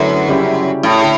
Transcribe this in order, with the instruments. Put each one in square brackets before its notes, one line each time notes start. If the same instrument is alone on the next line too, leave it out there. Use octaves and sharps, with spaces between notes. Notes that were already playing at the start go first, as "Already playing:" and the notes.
Already playing: [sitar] F#2 [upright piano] D3 A3 E4 B4
[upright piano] C#3 G3 C#4 E4 G4
[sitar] A2
[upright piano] D3